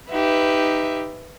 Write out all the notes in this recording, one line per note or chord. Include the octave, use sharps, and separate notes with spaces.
D#4 G4 B4 E5